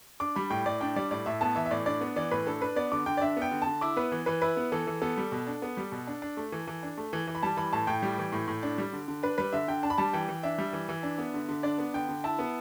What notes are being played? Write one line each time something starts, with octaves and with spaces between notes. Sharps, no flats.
D4 D6
G3 B5
A2 G5
A2 D5
D4 G5
G3 D5
A2 D5
A2 E5
B3 A5
E3 E5
E5
A2 D5
D4 D5
B3
E3 D5
A2 B4
D4 A4
D4 B4
B3 D5
D3 D6
D3 G5
D5
D4 E5
B3
G5
D3
A5
D3
E4 D6
B3 B4
E3
E3 B4
E4 B4
B3
E3 A4
E3
B3 A4
G3
B2
D4
B3
G3
B2
D4
D4
A3
E3
E3
D4
A3
E3
E3
B5
G3 A5
E3 B5
A2 A5
A2 G5
G3
E3
A2
A2
D4
G3
D3
D3
D4 B4
G3 B4
D3 E5
D3 G5
D4 A5
B5
G3 A5
E3 G5
E3
D4 E5
G3
E3
E3
D4
B3
D3
D3
D4 D5
B3
D3 G5
D3
E4 A5
B3